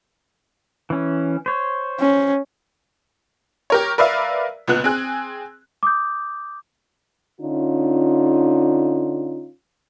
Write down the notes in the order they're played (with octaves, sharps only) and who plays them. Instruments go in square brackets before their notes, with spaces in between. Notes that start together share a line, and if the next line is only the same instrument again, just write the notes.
[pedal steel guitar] E3 C#4
C5 C#5
[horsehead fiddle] C#4
[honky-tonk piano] G4 A#4 C#5
A#4 B4 D5 E5 F5
C#2 A#2 B3 F#6
C4 G#4 F#6
[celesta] D6 D#6 G6
[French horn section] D3 C#4 D#4 F4